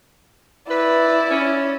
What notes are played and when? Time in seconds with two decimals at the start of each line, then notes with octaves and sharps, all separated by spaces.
0.70 E4 B4 D5
1.30 C#4